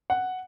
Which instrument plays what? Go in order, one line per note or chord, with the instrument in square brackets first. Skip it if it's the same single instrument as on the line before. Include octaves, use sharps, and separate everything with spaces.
[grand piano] F#5